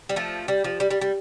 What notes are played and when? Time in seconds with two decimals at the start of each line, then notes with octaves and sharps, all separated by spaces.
0.09 G3
0.16 F3 A3
0.48 G3
0.64 F3
0.80 G3
0.91 G3
1.01 G3